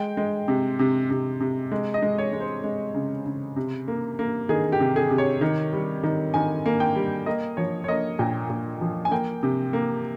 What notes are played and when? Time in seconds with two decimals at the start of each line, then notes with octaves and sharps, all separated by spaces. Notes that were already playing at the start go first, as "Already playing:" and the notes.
Already playing: G#3 G5
0.17 G#3
0.48 C3
0.79 C3
1.10 C3
1.41 C3
1.71 G#3
1.94 D#5
2.02 G#3
2.18 C#5
2.33 G#3
2.40 C5
2.64 G#3
2.94 C#3
3.26 C#3
3.56 C3
3.88 A#3
4.19 A#3
4.49 D#3 G#4
4.72 G4
4.80 C3
4.96 G#4
5.10 C3
5.18 C#5
5.41 D#3
5.73 G3
6.03 D#3
6.34 D#3 G#5
6.66 A#3
6.80 G5
6.96 G3
7.26 A#3 D#5
7.57 F3 C#5
7.84 C#5
7.88 A#3 D#5
8.19 A#2 G5
8.50 A#2
8.81 F3
9.05 G#5
9.11 A#3 G5
9.43 C3
9.73 A#3